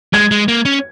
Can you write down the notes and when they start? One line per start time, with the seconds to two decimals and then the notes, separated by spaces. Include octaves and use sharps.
0.13 G#3 G#6
0.31 G#3
0.48 A#3
0.65 C#4